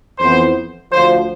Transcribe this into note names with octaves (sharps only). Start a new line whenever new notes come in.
F2 E3 B3 C5
D2 D3 F3 C5